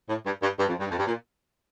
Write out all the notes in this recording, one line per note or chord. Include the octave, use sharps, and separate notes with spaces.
A2
G2
G2
G2
F2
G2
F2
G2
A#2